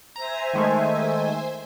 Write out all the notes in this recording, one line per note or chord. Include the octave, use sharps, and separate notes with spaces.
C5 E5 G#5 A#5
D#3 G#3 A3